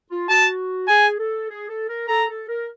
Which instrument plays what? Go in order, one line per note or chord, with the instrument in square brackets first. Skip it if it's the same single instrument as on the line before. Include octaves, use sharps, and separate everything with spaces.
[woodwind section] F4
[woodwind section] F#4 [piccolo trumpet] A5
[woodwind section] G#4 [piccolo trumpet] G#5
[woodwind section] A4
G#4
A4
A#4
[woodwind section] A4 [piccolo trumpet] A#5
[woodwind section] A4
A#4